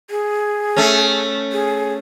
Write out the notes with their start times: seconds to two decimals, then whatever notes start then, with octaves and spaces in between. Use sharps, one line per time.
0.10 G#4
0.76 A3 C#4
1.53 G#4